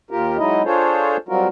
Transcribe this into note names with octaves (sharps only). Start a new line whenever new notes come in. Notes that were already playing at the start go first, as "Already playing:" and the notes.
D#2 F4 G4 A#4
F#3 G#3 D#4 E4 D#5
D4 F4 G#4 A4 C5 C#5
F#3 G3 C4 F4 F#4 A#4